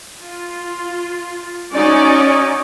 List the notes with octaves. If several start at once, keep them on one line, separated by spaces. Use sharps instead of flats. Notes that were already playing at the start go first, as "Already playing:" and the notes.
F4
C#4 D#4 F#4 D5